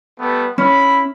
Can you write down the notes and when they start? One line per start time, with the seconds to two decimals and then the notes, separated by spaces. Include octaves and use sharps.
0.19 G3 A3 B3
0.58 C#4 E4 B5